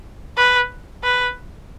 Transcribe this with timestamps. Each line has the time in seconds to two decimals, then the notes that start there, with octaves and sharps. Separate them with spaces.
0.37 B4
1.04 B4